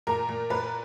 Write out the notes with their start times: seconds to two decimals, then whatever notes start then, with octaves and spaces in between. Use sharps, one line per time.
0.07 A#2 A#4
0.29 A#2
0.50 A#2 B4